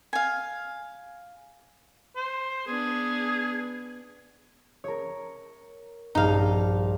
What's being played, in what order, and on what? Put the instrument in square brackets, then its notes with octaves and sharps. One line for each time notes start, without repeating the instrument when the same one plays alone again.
[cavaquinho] F5 G#5
[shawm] C5
[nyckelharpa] B3 D4 [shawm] G#4
[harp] A#4 C#5
[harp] A#1 G2 [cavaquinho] D#4 F5